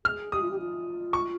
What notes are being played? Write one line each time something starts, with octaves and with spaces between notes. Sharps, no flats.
G#4 F6
G4 D#6
F4
G4
F4
C#6